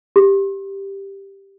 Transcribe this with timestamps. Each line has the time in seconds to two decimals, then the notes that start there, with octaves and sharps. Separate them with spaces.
0.16 G4